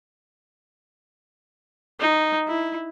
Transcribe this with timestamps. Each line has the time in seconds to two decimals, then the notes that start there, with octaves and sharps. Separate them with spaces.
2.00 D#4
2.48 E4